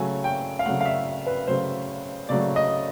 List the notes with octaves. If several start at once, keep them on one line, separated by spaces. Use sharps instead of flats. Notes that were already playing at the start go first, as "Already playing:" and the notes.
Already playing: C#3 F#3 A3 G#5
G5
F5
C#3 F#3 A3 F#5
F5
E5
B4
C#3 F#3 A3 C5
C#3 F#3 A3 D5
D#5